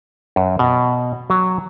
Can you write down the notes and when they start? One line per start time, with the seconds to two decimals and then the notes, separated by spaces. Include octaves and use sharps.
0.36 F#2
0.59 B2
1.30 F#3